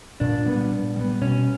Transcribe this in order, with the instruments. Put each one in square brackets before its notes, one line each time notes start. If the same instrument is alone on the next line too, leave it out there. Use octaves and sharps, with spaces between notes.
[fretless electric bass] A#2 [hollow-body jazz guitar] D4
[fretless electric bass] G3 B3
A#2
G3 B3
[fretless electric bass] B2 [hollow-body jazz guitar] C#4